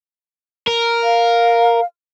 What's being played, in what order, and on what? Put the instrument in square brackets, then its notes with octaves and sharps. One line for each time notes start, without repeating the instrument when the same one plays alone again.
[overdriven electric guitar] A#4
[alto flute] F5